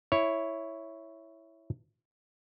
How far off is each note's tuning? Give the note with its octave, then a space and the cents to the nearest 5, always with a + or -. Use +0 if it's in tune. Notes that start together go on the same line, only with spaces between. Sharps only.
E4 +0 C#5 +0